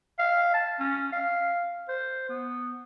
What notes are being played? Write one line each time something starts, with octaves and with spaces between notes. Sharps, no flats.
F5
A5
C#4
F5
C5
B3